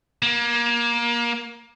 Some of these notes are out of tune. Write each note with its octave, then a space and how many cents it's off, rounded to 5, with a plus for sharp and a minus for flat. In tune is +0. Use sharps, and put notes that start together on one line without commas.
A#3 +25